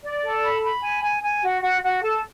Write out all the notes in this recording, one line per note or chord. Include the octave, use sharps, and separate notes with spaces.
D5
A4
B5
B5
G#5
G#5
G#5
F#4
F#4
F#4
A4